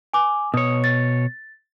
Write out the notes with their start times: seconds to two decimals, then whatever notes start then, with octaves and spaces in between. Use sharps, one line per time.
0.14 G#5 D6
0.54 B2 C#5 D#6
0.84 A6